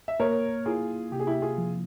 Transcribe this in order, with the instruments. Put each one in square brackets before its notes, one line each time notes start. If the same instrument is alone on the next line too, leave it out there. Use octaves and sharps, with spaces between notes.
[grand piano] E5
[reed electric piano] A#3 [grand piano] A#4 C#5
[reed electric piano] E4 [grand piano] F4 G#4
[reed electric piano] C3 [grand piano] G4
[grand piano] G#4
E4 G4
F4 G#4
[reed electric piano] F3